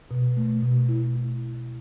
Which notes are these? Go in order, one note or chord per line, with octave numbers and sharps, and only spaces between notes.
B2
A3
B2
E4